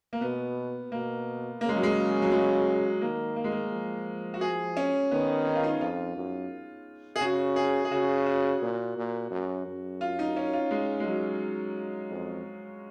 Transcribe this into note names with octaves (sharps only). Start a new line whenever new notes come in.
A#3
B2 B3
B2 A#3
C#3 A#3
G#3
F#3
G#3
F#3
G#3
D#3 A#3
A#3
G#3
A#3
F3
F#4
G#4
C#4
D#3 B3
D#4
F4
D#4
F2 F4
F#2
G#4
C#3 F#4
G#4
G#4
C#3 F#4
F#4
A#2
A#2
F#2
F#2
F4
D#4
C#4
F4
G#3
G#3
F#3
F2